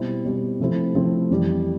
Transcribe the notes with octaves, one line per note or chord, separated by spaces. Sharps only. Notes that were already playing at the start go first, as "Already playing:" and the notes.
Already playing: B2 G3 C4 E4
B2 G3 C4 E4
C3 F3 A3 C4 E4
C3 F3 A3 C4 E4
F2 E3 G3